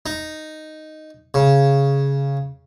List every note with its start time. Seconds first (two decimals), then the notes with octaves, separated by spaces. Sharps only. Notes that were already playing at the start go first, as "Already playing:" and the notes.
0.06 D#4
1.34 C#3